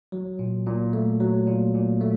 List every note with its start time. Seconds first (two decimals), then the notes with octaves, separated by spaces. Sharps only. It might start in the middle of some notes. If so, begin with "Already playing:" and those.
0.12 F#3
0.39 A#2
0.66 A#2
0.93 A3
1.20 F#3
1.47 A#2
1.74 A#2
2.01 A3